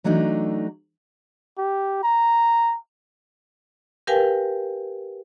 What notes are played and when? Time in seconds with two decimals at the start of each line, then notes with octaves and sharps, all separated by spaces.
0.04 E3 F#3 A3 D4 D#4
1.58 G4
2.03 A#5
4.07 G4 A#4 B4 F5 G5 G#5